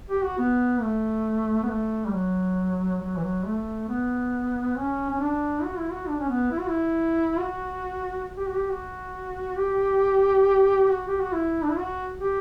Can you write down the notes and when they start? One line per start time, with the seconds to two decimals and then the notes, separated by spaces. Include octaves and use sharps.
0.09 G4
0.22 F#4
0.38 B3
0.81 A3
1.63 B3
1.69 A3
2.06 G3
2.12 F#3
3.01 F#3
3.17 E3
3.23 F#3
3.45 A3
3.89 B3
4.76 C#4
5.10 C#4
5.20 D4
5.63 F#4
5.78 E4
5.91 F#4
6.08 D4
6.19 C#4
6.29 B3
6.51 E4
6.60 F#4
6.69 E4
7.39 F#4
8.37 G4
8.47 F#4
8.56 G4
8.71 F#4
9.58 G4
10.90 F#4
11.08 G4
11.20 F#4
11.33 E4
11.63 D4
11.69 E4
11.78 F#4
12.20 G4